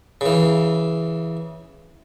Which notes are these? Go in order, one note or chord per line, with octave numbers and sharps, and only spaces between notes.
C#3 E3